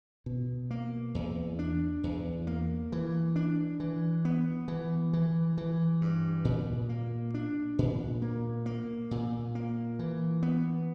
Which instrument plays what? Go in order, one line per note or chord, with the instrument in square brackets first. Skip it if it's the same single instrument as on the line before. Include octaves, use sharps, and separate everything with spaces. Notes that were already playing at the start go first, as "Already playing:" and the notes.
[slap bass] B2
A#3
E2
D4
E2
A#3
E3
D4
E3
B3
E3
E3
E3
G2
A#2
A#3
D4
A#2
A#3
A#3
A#2
A#3
E3
B3